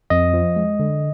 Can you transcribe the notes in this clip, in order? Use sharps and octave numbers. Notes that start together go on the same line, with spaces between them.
F2 D#5
F3
G#3
D3